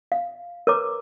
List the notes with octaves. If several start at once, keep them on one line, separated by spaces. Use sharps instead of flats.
F5
A#4 B4 C#5 A#5 D6